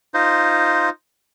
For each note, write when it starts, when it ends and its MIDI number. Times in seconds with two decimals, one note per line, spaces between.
0.14 0.89 63
0.14 0.89 65
0.14 0.89 72